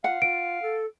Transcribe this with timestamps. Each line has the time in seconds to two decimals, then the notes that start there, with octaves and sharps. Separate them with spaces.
0.04 F4 F5 F#5
0.22 F4 D7
0.61 A4